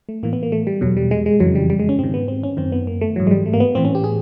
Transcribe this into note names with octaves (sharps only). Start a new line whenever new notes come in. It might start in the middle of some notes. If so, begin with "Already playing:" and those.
A3
A2 E3 A#3
B3
A#3
A3
G3
E2 B2 F#3
G3
G#3
G#3
F2 C#3 E3 F#3
G3
G3
G#3
C#4
G#2 D#3 C4
B3
C4
C#4
F#2 D#3 C4
B3
A#3
A3
G#2 E3 F#3
G#3
G3
A3
A#3
B3
A2 E3 C4
C#4
G4
G#4